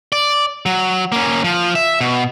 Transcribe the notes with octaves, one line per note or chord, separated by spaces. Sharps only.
D5
F#3
A#3 C#4
F3
E5
B2